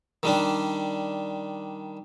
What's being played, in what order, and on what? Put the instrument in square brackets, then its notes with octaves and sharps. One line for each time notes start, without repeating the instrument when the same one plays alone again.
[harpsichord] D#3 G3 D4